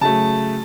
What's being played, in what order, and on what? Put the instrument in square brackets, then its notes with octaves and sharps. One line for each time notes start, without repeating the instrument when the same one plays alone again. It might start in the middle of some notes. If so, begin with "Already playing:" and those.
[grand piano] C#3 F#3 A3 A5